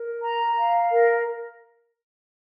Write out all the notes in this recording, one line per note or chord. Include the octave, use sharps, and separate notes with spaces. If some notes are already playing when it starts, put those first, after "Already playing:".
Already playing: A#4
A#5
F5
A#4